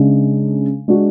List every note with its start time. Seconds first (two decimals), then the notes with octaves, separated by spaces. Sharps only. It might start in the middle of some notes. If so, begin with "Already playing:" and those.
Already playing: C#3 G#3 D4
0.88 G#3 D4 F#4